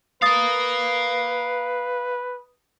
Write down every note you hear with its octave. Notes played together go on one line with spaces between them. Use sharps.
B4 F5 A#5 D#6 A6